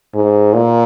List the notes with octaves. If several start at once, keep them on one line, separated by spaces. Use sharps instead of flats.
G#2
A#2